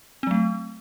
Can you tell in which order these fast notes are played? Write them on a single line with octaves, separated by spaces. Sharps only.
C4 F#3 A3